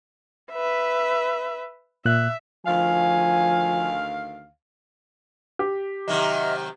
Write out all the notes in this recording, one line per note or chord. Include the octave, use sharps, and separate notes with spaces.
B4 E5
A#2 E5 F#6
D2 D#3 F3 F5 G#5
G4
C3 D#3 F#3 D#5 E5 F6